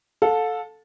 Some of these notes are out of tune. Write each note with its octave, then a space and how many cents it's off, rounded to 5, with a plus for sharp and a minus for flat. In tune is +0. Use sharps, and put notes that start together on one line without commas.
A4 -5 F5 +40